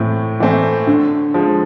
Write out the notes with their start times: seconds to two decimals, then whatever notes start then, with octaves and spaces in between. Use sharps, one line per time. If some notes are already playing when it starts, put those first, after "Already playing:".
Already playing: A2 E3 A3 C4
0.40 E3 A3 C4
0.87 D3
1.34 F3 G#3